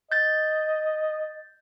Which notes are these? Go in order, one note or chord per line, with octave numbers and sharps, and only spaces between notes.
D#5 G6 A6